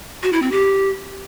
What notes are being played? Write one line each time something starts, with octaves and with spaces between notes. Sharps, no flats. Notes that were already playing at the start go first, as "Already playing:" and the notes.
F#4
E4
C4
G4